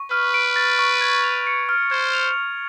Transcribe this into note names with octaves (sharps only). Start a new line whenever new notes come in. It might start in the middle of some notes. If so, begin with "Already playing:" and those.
Already playing: C#6
B4 F6
D7
A6
C#6
G#6
F7
C#7
F6
C5 G#6
F7